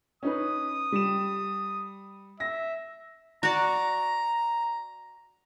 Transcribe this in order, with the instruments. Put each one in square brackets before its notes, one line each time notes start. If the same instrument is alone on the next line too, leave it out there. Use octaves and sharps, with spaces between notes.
[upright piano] C#4 D#4 B4 [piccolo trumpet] D#6
[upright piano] G3 E7
[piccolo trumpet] E5 [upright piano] A#6
[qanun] F#4 D5 [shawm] A#5